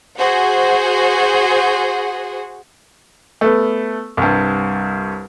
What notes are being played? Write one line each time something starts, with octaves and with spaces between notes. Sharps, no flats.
F#4 G#4 C5 F#5
A3 B3
C2 G2